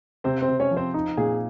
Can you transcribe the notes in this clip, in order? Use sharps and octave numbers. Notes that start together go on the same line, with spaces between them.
C3 C4 C5
C4 C5
C3
C#4 C#5
F3
C4 C5
D#4
A#2 G#4